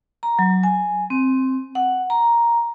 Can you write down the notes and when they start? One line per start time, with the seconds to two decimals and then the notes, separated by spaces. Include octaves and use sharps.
0.23 A#5
0.39 F#3
0.63 G#5
1.10 C4
1.75 F#5
2.10 A#5